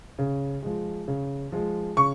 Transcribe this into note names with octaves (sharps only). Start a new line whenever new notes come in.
C#3
F3 G#3
C#3
F3 G#3
C#3 C#6